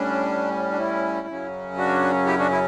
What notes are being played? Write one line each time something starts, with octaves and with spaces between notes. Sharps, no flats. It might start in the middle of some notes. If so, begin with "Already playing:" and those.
Already playing: A2 G3 C#4 D4
D4
E4
F#2 C#3 F#3 C#4
D4 F#4
E4 G4
D4 F#4
E4